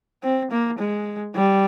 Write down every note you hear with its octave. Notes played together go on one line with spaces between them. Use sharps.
C4
A#3
G#3
G3